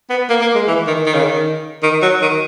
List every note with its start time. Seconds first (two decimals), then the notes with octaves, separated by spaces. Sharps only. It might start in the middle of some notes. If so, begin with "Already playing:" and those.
0.10 B3
0.29 A#3
0.41 A#3
0.55 G#3
0.68 E3
0.87 D#3
1.06 D#3
1.14 C#3
1.23 D#3
1.83 D#3
2.02 F#3
2.21 D#3